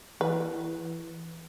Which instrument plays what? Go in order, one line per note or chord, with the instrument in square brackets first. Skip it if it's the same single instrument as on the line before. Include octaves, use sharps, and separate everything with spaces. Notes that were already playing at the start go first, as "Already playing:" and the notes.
[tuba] E3 [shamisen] B4